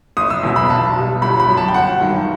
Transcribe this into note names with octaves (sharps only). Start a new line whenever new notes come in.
F#1 D#6
E6
E2 B2 F#3
B5
B1 A5
B2 G3
G1 B5
B5
F#2 F#3
A5
G5
G1 F#5
G2 D#3 F#3